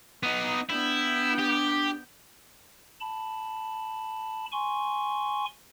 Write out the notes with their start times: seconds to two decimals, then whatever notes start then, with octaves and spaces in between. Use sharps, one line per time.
0.23 B3 D#4 D#6
0.70 B3 D4 E4 G5
1.39 G4
3.00 A5 B5
4.52 G#5 C6 C#6